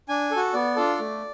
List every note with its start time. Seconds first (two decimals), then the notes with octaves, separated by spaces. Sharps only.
0.09 D4 G#5
0.31 F#4 A4
0.54 B3 D5
0.76 D4 F4 A4
0.99 A3